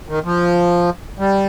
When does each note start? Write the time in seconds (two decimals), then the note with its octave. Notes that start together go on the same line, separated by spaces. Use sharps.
0.08 D#3
0.24 F3
1.19 G3